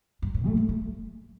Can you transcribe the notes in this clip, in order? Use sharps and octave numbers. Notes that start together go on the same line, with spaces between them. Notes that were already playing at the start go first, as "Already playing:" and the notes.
G2
A2
A3
G3
A3